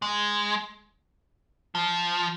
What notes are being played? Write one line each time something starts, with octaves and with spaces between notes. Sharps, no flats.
G#3
F3